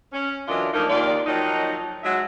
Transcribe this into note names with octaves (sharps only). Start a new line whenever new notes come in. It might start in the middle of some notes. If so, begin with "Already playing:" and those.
C#4
E3 F#3 D4 F4 A#4 D#5
F3 A3 A#3 D4 D#4 A#4
D#2 F4 D5
D#3 F3 F#3 D#4
F#3 G#3 E5